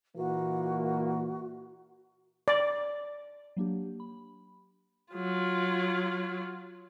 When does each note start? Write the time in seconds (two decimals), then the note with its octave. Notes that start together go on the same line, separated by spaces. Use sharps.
0.17 A#2 E3 A#3 F#4
2.48 D5
3.57 F#3 A#3 D4 G4
4.00 B5
5.13 F#3 F4